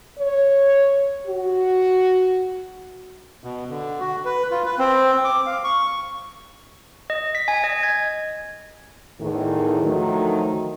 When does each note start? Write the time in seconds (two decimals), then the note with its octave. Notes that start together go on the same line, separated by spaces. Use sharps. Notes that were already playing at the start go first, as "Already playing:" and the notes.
0.19 C#5
1.27 F#4
3.44 B2
3.70 D3
4.00 F#4
4.25 B4
4.51 F4
4.66 B4
4.78 C4
5.24 D6
5.46 F5
5.64 C#6
7.10 D#5
7.35 B6
7.48 G#5
7.64 D#5
7.83 G#6
9.20 E2 A2 D#3
9.84 D3 D#3 F3 F#3 A3